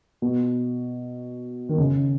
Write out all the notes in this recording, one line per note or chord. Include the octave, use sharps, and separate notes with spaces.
B2
D#3
C#3